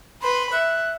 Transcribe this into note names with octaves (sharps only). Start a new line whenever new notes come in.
B4 B5 C6
E5 F#6